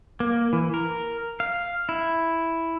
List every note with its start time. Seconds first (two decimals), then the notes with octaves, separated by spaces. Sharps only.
0.20 A#3
0.53 E3
0.74 A#4
1.40 F5
1.89 E4